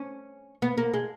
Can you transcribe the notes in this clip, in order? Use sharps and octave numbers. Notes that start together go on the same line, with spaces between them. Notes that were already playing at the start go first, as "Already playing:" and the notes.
Already playing: C#4
B3
A#3
G#3